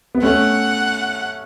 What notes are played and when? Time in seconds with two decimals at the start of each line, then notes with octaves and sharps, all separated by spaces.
0.15 B3
0.22 A3 C#4 F#5